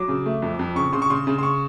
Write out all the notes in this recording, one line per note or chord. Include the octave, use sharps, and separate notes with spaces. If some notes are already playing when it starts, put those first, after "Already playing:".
Already playing: F#3 D6
C#3
A3
F2
F2
C#3 C#6
C#3 C6
C#6
C#3 C6
C#3
C6
C#6